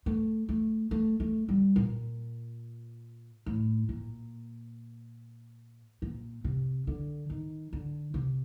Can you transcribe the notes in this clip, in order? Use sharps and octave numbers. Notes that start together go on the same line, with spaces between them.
A3
A3
A3
A3
G3
A#2
A2
A#2
A#2
C3
D3
D#3
D3
C3